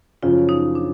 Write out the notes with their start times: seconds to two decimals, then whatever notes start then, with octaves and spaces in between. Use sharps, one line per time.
0.22 F#2 C#3 F3 F4
0.49 D#4
0.75 D4